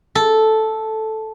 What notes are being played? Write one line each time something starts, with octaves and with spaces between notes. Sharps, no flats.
A4